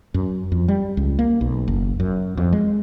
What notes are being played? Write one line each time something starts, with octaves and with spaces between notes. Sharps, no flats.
F#2
F2
G3
C#2
A#3
B1
F#1
F#2
F2
G#3